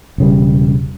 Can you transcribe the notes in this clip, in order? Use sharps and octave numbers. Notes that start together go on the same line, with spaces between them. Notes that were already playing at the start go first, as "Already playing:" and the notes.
E1 C#3 G3